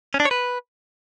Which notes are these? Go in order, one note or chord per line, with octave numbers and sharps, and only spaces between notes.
C#4
D4
C#5
B4